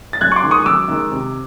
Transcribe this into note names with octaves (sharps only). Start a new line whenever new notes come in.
A6
F#2 F#6 G#6
C#6
C6 D6
D#3 G#3
C#6 D#6
D#6
F#2 D6 E6
D#3 G#3
C3